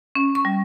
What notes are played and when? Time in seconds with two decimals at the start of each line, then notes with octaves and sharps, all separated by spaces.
0.15 C#4
0.35 C#6
0.45 G3